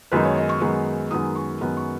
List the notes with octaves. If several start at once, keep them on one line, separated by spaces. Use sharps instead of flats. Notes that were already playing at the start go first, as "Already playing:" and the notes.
F#2 D#3 G#3 B3 D#4 B4
C#5
D#5
C#6
F#2 D#3 G#3 B3 D#4
F#2 D#3 G#3 B3 D#4 D#6
C#6
F#2 D#3 G#3 B3 D#4
C#6